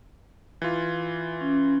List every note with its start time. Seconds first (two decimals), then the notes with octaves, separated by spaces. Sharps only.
0.62 E3 F4
1.41 C#4